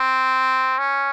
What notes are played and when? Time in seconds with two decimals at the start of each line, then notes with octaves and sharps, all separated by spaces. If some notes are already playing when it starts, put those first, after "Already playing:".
Already playing: C4
0.78 C#4